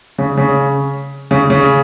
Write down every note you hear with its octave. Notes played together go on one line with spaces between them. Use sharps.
C#3
C#3
C#3
C#3